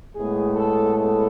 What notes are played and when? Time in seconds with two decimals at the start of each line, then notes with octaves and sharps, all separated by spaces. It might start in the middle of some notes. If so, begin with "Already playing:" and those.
0.16 A2 G#3 B3 G#4
0.56 A4
0.95 A4